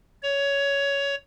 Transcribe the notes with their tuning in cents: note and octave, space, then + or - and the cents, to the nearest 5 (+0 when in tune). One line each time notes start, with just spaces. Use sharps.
C#5 +15